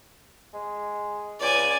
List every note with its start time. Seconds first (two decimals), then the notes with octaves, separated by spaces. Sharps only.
0.54 G#3
1.40 C#2 D5 G#5